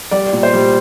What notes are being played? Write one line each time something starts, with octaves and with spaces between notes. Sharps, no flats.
G3 D5
A#2
C5
G3